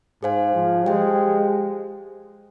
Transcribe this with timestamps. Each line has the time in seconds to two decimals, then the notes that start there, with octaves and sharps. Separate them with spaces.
0.23 G#2 G#4 C5 F5 G#5
0.55 F3
0.86 G#3 G4 C5 G5